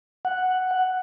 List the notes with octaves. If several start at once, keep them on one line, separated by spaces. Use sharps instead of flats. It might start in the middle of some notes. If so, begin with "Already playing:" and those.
F#5